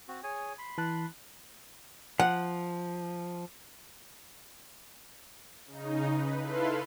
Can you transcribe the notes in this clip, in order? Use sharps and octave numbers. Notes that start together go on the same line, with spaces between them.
C4 F#4
G#4 C#5 G#5
B5 C6
E3 A5 F#6
F3 F#5
C#3 D#4
B4
E4 A4 B4 F5 C6